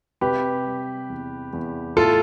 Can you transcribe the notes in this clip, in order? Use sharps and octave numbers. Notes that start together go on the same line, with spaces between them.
C3 G4 B4
G3
E2
E2
A2 F4 A4